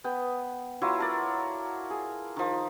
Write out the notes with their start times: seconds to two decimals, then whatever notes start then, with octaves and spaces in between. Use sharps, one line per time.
0.04 B3 G5
0.82 F#3 E4 F4
0.99 A4 A#4 D5
1.90 G#4
2.37 D#3 F3